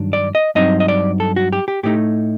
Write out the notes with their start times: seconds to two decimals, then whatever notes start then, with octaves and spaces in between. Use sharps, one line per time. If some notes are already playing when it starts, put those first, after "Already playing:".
Already playing: G2 D#3 F#3 D4
0.13 D5
0.35 D#5
0.55 G2 F#3 C4 D#4 D#5
0.80 D#5
0.88 D5
1.20 A4
1.36 F#4
1.53 G4
1.68 G4
1.83 A2 A3 D#4 G4